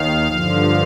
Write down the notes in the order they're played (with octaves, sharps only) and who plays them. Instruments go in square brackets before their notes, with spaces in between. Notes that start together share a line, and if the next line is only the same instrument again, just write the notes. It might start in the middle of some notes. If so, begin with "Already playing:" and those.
Already playing: [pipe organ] D#2 D#3 F5
G2 D3 F3